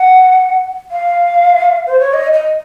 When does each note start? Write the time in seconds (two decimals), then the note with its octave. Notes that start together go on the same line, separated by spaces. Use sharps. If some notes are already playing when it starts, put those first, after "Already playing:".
Already playing: F#5
0.91 F5
1.86 C5
1.99 C#5
2.13 D#5
2.33 D#5